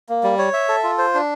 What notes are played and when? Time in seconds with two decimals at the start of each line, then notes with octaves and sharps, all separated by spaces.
0.09 A#3
0.24 G3
0.39 C#5
0.54 E5
0.69 A4
0.83 F4
0.98 C5
1.14 D4